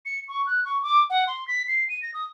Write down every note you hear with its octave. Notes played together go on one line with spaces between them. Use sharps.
C#7
C#6
F#6
C#6
D6
F#5
C6
B6
C7
D#7
A#6
D#6